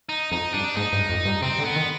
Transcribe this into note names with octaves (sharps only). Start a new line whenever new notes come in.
D#4
F2 D#4
G2 D4
G#2 D#4
G2
F2
G2
C3 C4
D3
B3
D#3